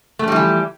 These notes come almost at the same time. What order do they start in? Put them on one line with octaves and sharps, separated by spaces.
A3 F3 G3 E3 G4